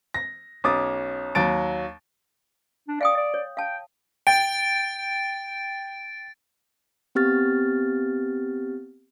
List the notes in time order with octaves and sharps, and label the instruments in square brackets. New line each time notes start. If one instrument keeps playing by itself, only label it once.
[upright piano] A#6
B1 C#4 D6 D#6 A6
D#2 F#3 A6 D7
[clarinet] D4
[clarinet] D5 [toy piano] F5 G5 D#6
[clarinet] D5
[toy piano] C#5
[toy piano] F5 A5 [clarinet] G5
[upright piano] G5 [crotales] A6 D7
[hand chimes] B3 C4 G4 F6 A6